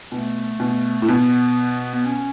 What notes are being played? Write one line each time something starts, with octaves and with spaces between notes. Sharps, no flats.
B2 A3
B2
A2
B2 B3
B3
C#4